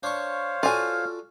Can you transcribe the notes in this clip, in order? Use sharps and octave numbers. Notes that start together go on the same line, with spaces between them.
D4 C5 C#5 F5 C#6
F4 F#4 A4 D5 G#5 F6